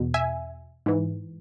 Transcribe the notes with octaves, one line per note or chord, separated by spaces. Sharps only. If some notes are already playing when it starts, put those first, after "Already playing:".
Already playing: E2 B2
E5 G#5
G#2 E3